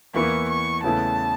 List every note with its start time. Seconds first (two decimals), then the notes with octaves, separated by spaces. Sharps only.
0.14 E2 E3 A#3 E4 C#6
0.49 C#6
0.83 E2 C#3 E3 A3 E4 A5